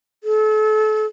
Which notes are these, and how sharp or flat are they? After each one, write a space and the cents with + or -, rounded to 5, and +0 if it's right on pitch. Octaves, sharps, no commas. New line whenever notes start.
A4 -35